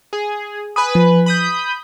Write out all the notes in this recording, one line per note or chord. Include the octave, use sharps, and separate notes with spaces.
G#4
B4 G#5 B5 D#6
F3
B5 D#6 G6